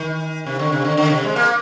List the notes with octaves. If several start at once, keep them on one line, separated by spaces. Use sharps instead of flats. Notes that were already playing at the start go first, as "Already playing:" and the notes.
Already playing: D#3
C3
D3
C3
D3
D3
C3
G#3
A#3